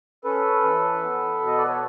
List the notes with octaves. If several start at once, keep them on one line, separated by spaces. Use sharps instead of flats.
C#4 A4 B4
E3
B3
B2
D#5
D5
C#5